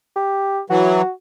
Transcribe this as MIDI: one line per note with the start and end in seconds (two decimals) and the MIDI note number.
0.16 0.60 67
0.70 1.02 52
0.70 1.02 54
0.70 1.10 66